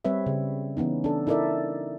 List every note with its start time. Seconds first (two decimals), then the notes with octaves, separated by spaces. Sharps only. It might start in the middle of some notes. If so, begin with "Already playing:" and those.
0.05 G3 C4 B4 C#5 E5
0.26 C#3
0.77 E3 B3 C#4 D#4
1.04 D4 A4
1.27 D#4 E4 A4 A#4 D5 E5